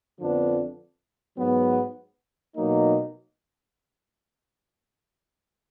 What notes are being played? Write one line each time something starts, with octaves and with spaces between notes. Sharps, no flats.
F2 D3 F3 B3 D4
G#2 F#3 B3
B2 F#3 A#3 D#4